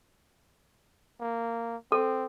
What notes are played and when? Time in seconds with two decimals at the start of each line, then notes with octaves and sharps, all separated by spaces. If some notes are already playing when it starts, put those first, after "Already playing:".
1.21 A#3
1.92 C4 A4